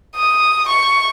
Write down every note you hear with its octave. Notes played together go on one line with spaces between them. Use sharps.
D#6
C#6